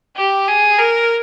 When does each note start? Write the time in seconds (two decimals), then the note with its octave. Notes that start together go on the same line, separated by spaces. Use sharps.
0.16 G4
0.48 G#4
0.79 A#4